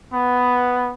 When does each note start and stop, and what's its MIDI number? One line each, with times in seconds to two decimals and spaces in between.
0.12 0.93 59